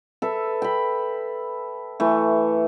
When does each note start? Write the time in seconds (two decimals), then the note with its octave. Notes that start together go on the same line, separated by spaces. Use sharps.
0.22 A4 B4 E5
0.62 G5 B5
2.00 E3 A3